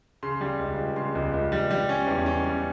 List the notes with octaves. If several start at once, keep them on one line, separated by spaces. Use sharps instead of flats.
C#3 C6
G3
C#2
C#3
C#3 C6
C#2
C#2
G3
G3
C#4
E2
C#4
G3